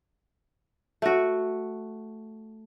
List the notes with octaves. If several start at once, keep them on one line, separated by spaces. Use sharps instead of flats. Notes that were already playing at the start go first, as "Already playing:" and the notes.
A3 F#4